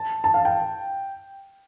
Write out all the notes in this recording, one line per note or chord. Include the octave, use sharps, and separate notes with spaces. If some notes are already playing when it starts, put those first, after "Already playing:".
Already playing: A5
A5
F5
G5